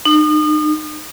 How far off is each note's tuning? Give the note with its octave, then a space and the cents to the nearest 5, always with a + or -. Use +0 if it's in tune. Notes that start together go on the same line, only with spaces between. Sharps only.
D#4 -35